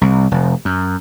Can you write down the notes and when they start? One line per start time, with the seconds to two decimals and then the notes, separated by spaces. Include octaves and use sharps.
0.01 C2
0.31 F1
0.65 F#2